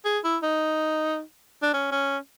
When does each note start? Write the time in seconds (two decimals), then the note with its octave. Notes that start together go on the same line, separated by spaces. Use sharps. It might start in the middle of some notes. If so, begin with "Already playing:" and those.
0.05 G#4
0.24 E4
0.43 D#4
1.62 D4
1.74 C#4
1.91 C#4